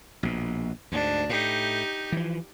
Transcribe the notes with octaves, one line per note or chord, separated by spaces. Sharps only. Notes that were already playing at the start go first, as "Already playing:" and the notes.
A#1 B2
D2 G#2 D4
A2 D#4 G4
E3 F3